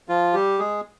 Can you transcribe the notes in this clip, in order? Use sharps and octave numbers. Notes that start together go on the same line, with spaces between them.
F3 F4
G3 G4
G#3 G#4